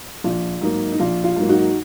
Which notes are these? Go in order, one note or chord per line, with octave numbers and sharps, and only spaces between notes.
A#1 F4
G#2 F#3 A#3 D#4
D#4
A#1 F4
F4
G#2 F#3 A#3
D#4 F#4